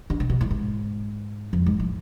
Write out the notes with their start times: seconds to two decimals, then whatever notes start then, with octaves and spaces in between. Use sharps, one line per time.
0.10 D3
0.20 C3
0.30 B2
0.41 A2
0.51 G#2
1.53 F2
1.66 G#2
1.80 A2